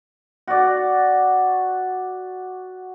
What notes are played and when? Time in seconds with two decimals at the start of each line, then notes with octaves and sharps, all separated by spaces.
0.48 F#4 D5